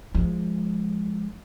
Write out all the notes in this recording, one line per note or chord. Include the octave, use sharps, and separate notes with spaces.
F3 G#3